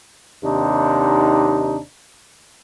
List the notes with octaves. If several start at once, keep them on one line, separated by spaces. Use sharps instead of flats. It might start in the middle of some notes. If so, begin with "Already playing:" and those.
D#2 C3 D4 D#4